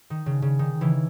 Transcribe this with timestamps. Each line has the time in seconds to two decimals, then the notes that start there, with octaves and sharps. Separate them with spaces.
0.10 D#3
0.26 C#3
0.42 C#3
0.59 D#3
0.81 C#3 E3